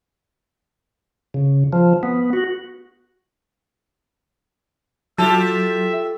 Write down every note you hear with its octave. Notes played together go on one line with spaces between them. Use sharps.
C#3
F3
B3
F#4
F#3 F4 G4 A4 E5 A5